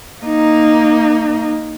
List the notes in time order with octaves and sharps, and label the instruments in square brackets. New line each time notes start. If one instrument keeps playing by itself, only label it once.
[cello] A#3 D#4